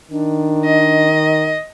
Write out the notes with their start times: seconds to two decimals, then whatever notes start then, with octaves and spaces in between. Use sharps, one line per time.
0.11 D#3 D4
0.65 D#5